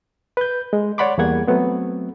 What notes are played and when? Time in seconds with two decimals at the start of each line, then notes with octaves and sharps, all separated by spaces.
0.37 B4 G6
0.73 G#3
0.98 C#5 D5 F#5 B5 C6 D6
1.18 E2 G3 A#3 G#4 F#5 G#6
1.47 F#3 A3 B3 C4